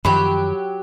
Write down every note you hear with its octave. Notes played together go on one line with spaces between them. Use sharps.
F#2 D#3 F3 F#3 G4 B5